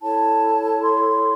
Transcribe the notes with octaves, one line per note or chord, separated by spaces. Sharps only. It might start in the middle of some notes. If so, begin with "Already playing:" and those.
E4 A4 C#5 A5
C6